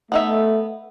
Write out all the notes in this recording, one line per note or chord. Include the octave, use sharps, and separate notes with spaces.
A3 B3 D#4 E5